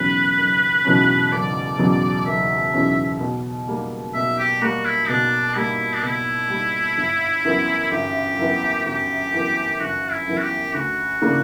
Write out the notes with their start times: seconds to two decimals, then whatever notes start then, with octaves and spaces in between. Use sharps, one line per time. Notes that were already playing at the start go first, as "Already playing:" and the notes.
Already playing: F#1 E2 B2 F#3 C#4 B4
0.38 F#1
0.85 E2 B2 F#3 C#4
1.32 F#1 D5
1.79 E2 B2 F#3 C#4
2.26 F#1 E5
2.73 E2 B2 F#3 C#4
3.21 B2
3.68 G3 A#3
4.14 B2 E5
4.38 G4
4.62 G3 A#3 F#4
4.85 E4
5.09 B2 D4
5.56 G3 A#3 E4
5.95 D4
6.03 B2 E4
6.50 G3 A#3
6.98 G1
7.45 F#2 E3 B3
7.91 G1 G4
8.39 F#2 E3 B3
8.86 G1 G4
9.34 F#2 E3 B3
9.80 G1 F#4
10.11 E4
10.28 F#2 E3 B3
10.38 F#4
10.44 G4
10.74 D2 F#4
11.21 C#3 E3 A#3 D4